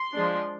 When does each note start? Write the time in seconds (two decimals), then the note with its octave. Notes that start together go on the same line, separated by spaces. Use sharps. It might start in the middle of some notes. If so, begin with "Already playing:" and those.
Already playing: C6
0.14 F3 G#3 D4